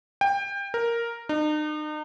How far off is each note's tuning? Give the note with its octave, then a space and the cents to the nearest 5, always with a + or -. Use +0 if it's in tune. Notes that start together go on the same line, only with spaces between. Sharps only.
G5 +25
A#4 +0
D#4 -40